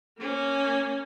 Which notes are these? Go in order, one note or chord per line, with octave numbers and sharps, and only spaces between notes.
A#3 C#4